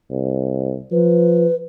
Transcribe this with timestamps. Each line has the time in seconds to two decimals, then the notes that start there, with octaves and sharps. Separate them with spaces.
0.11 C2
0.92 F3 B4